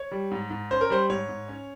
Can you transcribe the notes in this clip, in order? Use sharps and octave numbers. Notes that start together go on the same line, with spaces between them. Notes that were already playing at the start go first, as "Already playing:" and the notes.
Already playing: C#5
G3
G#2
G#2
C#4 C5
A#4
G3 C5
G#2 C#5
G#2
C#4